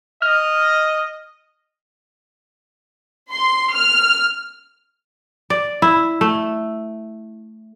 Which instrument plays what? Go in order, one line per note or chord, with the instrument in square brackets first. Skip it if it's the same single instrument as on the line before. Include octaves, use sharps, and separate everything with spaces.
[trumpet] D#5 [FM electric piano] F6
[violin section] C6
F6
[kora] D5
E4
A3